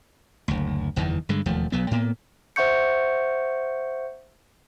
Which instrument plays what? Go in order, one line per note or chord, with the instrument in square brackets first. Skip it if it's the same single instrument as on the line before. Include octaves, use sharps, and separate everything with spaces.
[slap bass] F#1 D2
F#1 E2 D#3 E3
G2 D3 G#3
E1 D#2 F3 A3
B1 F#3 B3
A2 A#3 B3
[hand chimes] C5 E5 F#5 C#6 G6 C#7